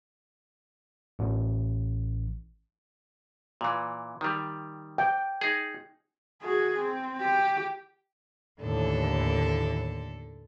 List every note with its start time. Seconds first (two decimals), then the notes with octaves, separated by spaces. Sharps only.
1.19 A1
3.61 A#2 E3
4.21 D#3 G3
4.98 G5
5.41 D#4 G#4
6.42 F#4 G#4
6.79 C4
7.21 G4
8.61 D#2 A2 D3 E3 A4